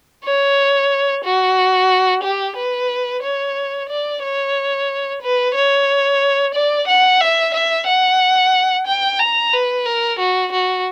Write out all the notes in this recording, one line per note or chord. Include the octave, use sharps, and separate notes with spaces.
C#5
F#4
G4
B4
C#5
D5
C#5
B4
C#5
D5
F#5
E5
E5
F#5
G5
A#5
B4
A#4
F#4
F#4